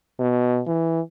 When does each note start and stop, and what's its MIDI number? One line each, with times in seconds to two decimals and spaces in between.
0.19 0.61 47
0.67 1.01 52